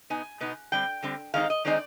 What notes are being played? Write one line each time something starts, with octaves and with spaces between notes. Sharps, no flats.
B2 B3 D#4 G#5
B2 B3 D#4
D3 G3 C4 G5
D3 G3 C4
D#3 G#3 C4 D#4 F5
D#5
D#3 G#3 C4 D#4 D5